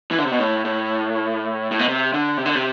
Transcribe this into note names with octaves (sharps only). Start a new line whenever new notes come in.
E3
D3
C3
B2
A2
A2
A2
B2
C3
D3
C3
D3
C3